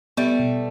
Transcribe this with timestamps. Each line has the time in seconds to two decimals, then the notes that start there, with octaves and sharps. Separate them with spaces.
0.17 G3 A3 B3
0.40 B2